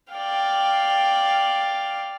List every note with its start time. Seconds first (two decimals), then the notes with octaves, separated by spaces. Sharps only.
0.12 D5 F5 G5